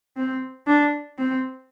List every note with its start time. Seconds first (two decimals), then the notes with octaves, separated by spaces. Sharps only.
0.17 C4
0.67 D4
1.18 C4